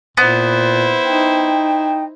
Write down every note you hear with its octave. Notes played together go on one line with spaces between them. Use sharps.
A#2 B3 E4 C5
D#4 G5